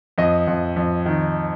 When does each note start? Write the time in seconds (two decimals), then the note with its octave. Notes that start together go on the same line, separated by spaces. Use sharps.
0.18 F2 D#5
0.47 F2
0.76 F2
1.06 D#3